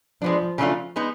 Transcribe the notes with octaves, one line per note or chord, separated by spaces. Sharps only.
F3 G#3 B3 D4
C#3 F#3 A3 D4 F4
G#3 B3 D#4